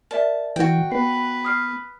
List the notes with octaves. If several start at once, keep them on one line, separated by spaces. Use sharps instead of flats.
A#4 D5 E5 A5
E3 F#4 G5
B3 B4 C7
D#6 F6 C7